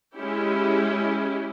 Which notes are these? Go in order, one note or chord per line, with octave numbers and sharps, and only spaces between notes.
G#3 C#4 E4 G4